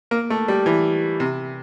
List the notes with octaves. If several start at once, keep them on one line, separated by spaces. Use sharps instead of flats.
A#3
A3
G3
E3
C3